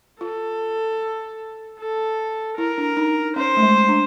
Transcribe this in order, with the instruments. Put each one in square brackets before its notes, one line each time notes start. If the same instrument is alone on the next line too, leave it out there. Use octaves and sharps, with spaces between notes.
[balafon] F4 [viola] A4
[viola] A4
[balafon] E4 [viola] A#4
[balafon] D4
D#4
[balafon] C#4 [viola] C5
[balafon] A3
G#3
D4